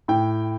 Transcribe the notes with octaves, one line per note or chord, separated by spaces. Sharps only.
A2 G5